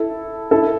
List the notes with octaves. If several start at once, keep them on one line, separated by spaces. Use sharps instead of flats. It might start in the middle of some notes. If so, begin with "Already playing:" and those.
Already playing: E4 A4
E4 A4